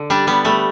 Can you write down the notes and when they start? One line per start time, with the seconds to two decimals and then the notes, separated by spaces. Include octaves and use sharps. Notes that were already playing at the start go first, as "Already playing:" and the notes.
Already playing: D3
0.10 G3 D4
0.27 G3 B3
0.45 G3 A3